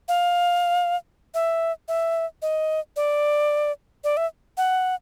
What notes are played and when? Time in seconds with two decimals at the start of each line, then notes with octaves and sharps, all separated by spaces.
0.08 F5
1.34 E5
1.88 E5
2.42 D#5
2.96 D5
4.04 D5
4.17 E5
4.57 F#5